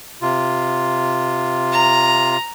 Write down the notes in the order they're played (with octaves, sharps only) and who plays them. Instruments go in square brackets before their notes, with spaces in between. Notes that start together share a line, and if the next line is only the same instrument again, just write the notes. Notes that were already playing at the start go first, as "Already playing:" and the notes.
[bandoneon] C3 F4
[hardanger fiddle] A#5